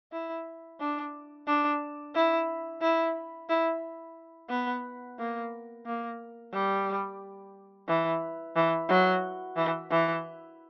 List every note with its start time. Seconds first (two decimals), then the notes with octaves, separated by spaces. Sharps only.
0.12 E4
0.80 D4
1.47 D4
2.15 E4
2.81 E4
3.49 E4
4.50 B3
5.18 A#3
5.86 A#3
6.53 G3
7.88 E3
8.56 E3
8.89 F#3
9.57 E3
9.91 E3